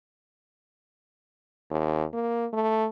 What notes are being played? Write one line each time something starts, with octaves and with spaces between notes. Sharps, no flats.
D#2
A#3
A3